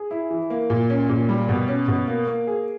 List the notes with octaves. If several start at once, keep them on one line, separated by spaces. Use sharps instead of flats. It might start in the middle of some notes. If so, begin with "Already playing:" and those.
Already playing: G#4
E4
E3
A#3
A#2
C#4
A#2
G3
B2
C#4
B2
A#3
A#3
G#4